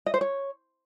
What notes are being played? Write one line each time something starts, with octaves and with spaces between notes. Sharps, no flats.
D#5
C5
C#5